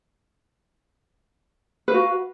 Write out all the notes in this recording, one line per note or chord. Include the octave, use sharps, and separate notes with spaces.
F#4 B4 F5